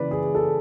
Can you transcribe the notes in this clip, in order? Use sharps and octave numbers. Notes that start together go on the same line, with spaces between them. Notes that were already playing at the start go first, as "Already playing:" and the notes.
Already playing: C#3 E3 B4 D5
G#4
A4